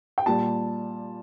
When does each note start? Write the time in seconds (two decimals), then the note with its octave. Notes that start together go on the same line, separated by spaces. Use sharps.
0.18 G5
0.26 A#2 G3 A5